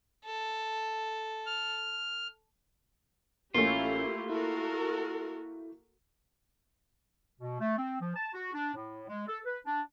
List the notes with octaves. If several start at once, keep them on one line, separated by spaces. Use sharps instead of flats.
A4
F6
A1 A3 A#3 C#4 E4 F4 G4
E4 F#4 A4 A#4
B2
A3
C4
F3
A5
F#4
D4
A2
G#3
A4
B4
D4